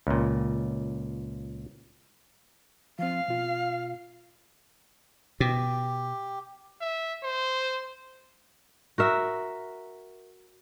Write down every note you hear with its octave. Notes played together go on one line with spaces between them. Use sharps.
C#2 A#2
F3 C4 F5
B2 F4
B2 G4
E5
C5
F#4 A#4 E5